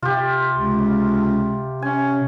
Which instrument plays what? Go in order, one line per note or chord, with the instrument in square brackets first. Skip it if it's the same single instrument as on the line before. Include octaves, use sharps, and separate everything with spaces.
[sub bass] C3 [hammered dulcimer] F4 G4
[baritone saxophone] C#2
[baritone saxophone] C#4 [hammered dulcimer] G#5